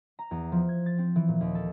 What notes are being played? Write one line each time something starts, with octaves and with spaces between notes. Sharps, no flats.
A#5
E2
F3
G#6
A6
C4
E3
A#2
D#2
A4